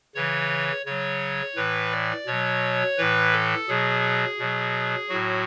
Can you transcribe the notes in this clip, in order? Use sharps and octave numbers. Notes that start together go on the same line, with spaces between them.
C#3 E3 C#5
C#3 F#3 C#5
A2 E3 B4
D5
B2 F#3 C#5
A2 E3 B4
A4
B2 F#3 G#4
B2 F#3
A2 F#3 F#4